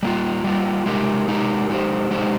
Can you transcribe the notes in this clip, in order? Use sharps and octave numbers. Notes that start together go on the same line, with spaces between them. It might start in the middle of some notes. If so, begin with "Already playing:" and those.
G3 A#3 F4
G3 A#3 F4
G#3 D#4 G4 A#4
G#3 D#4 G4 A#4
G#3 D#4 G4 C5
G#3 D#4 G4 C5